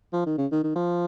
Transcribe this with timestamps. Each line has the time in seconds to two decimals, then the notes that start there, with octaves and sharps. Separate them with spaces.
0.13 F3
0.26 D#3
0.38 C#3
0.51 D#3
0.63 D#3
0.75 F3